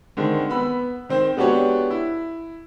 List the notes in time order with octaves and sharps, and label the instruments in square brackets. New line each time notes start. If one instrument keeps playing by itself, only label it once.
[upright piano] D3 D#3 G#3 C4
B3 B5 E6
D#3 C4 C5
G#3 B3 D4 F#4 G4 C#5
E4